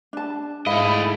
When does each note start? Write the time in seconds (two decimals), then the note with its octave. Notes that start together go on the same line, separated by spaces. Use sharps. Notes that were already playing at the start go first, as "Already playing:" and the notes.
0.13 D4 A5
0.66 G#2 A3 E4 D#5 F5 B5